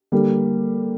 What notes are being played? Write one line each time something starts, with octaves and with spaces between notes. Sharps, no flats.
D3 G3 A#3